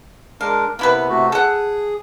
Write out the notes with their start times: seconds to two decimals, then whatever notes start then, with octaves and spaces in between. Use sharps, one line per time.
0.41 G#3 D4 A#4 F5
0.79 C3 A#3 B3 E4 B4
1.09 C3 A3 F#4
1.32 G#4 A4 F#5